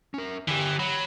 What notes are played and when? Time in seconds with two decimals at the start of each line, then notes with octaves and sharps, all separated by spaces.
0.14 C#4 A#4
0.48 D3 E3 G4
0.79 F#3 B5